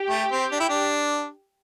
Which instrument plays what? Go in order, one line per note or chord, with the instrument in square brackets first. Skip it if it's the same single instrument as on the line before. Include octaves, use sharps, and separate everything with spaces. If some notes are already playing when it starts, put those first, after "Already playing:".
Already playing: [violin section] G4
[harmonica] A3
C4
D4
E4
D4